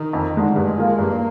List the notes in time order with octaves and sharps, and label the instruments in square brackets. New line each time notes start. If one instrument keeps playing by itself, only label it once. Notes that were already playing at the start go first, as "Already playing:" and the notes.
Already playing: [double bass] D#3
[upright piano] F2
D3 G#3 D#4
[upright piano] G2 [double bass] G#3
[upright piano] F3 A#3 F4
[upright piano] G2 [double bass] A#3